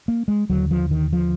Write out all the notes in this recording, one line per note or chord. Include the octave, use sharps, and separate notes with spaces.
A#3
G#3
D#2 D3 F#3
F3
D#3
F3